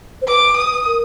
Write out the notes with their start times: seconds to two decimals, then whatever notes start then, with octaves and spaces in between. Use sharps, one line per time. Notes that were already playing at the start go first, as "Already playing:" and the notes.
0.22 C5
0.27 B4 D6
0.57 D#6
0.87 A#4